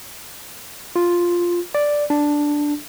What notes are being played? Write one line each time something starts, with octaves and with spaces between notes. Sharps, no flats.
F4
D5
D4